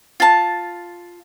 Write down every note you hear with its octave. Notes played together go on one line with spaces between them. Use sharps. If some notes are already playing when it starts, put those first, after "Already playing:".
F4 A5